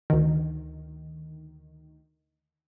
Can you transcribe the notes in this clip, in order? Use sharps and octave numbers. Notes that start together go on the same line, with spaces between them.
D2 D#3